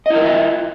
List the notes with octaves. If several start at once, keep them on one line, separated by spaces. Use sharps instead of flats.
E4 F4 A#4 D#5 E5